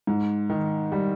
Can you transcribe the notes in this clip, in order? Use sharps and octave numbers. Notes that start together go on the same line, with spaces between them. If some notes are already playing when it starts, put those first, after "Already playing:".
G#2
D#3
G3